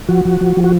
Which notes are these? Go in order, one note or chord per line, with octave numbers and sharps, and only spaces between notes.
F3 F#4
F3
F3
F3
F#4